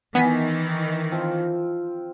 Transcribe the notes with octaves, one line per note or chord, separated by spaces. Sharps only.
D#3 E3 B3 G#5 B6
F3 C4 F4